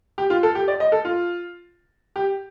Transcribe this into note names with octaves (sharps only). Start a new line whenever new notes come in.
G4
F4
A4
G4
D5
D#5
A4
F4
G4